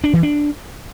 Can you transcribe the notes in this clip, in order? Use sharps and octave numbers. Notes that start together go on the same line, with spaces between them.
D4
E3
D4